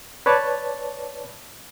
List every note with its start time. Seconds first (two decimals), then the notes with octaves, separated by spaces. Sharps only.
0.26 B4 C#5 D5 A5